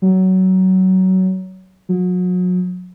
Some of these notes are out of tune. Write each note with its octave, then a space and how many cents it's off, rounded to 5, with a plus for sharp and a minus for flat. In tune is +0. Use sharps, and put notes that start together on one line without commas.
F#3 +20
F#3 -35